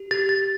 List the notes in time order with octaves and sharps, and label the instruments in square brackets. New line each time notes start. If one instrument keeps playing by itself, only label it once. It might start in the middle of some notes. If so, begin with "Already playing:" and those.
Already playing: [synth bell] G4
[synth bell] G4 [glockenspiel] A6
[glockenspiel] A6